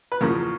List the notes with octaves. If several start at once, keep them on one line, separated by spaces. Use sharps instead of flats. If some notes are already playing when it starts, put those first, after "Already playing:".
B4
E2 C#3 F3 A#3 A#4